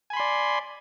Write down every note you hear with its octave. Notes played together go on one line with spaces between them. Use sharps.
D5 G#5 B5 C6